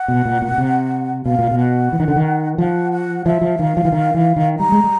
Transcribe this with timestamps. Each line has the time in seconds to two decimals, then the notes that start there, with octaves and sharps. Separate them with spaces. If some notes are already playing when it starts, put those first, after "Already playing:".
Already playing: F#5
0.08 B2
0.26 A#2
0.42 A#2
0.52 B2
0.58 C3
1.26 B2 F5
1.39 A#2
1.51 B2
1.59 F#5
1.93 E3
2.00 D#3
2.08 D3
2.16 D#3
2.58 F3 F#5
2.92 F#5
3.26 F3 E5
3.42 F3
3.59 D#3 F5
3.77 F3
3.85 E3
3.92 D#3
4.14 E3
4.36 D#3
4.59 G3 A#5
4.72 G#3
4.84 G3